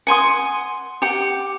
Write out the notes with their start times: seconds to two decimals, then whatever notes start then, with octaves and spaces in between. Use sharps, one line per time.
0.07 F#5 G#5 C6 D#6
1.02 G4 F#5